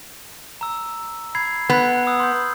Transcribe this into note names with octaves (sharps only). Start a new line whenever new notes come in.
A#5 E6
B5 G#6 C7
B3 F#6
D#6 E6
C6 G6